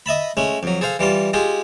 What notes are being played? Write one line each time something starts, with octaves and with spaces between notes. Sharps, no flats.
D#5 E5 A5 B5
G#3 A3 C#4
F2 F#3
G#4 A4 C5 F5
E3 G3 F4 A5
G#3 F4 G4 G#4